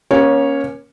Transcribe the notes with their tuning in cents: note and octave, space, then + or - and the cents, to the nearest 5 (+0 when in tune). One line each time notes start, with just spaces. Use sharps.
A#3 +30 C#4 +0 C#5 -10